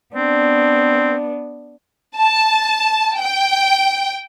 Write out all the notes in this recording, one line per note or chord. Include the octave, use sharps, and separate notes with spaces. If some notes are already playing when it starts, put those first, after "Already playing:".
B3 C4 D4
A5
G5